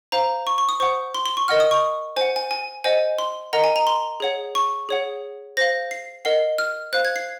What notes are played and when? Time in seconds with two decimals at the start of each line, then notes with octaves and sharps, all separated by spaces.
0.12 C5 F5 A#5
0.47 C#6
0.58 C#6
0.69 D#6
0.80 C5 F#5 C#6
1.14 C6
1.26 C6
1.37 C#6
1.48 A#4 D#5 F#5 F6
1.60 D#6
1.71 C#6
2.16 C5 F#5 G#5
2.36 G#5
2.51 G#5
2.84 C5 D#5 F#5 G#5
3.19 C6
3.53 A#4 D#5 F#5 A#5
3.64 G#5
3.76 A#5
3.87 C6
4.20 G#4 C#5 F#5
4.55 C#6
4.89 G#4 C#5 F#5
5.57 C5 F5 A#6
5.91 C7
6.25 A#4 D#5 F#5 C7
6.58 F6
6.93 C5 F5 F#6
7.05 G#6
7.16 C7